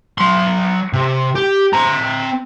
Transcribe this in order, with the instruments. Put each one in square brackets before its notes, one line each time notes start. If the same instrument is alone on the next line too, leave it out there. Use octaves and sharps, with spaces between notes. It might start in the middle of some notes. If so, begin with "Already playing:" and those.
[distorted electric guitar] F#3 C6
C3
G4
C4 A#5